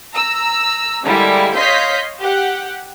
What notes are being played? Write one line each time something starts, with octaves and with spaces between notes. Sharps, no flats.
A#5 E6
D3 G3 G#3 A#3 E4
C#5 D#5 F5 C6 G6 B6
G4 F#5